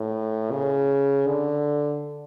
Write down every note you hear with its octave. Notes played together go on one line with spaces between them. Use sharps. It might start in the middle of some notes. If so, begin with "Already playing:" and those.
Already playing: A2
C#3
D3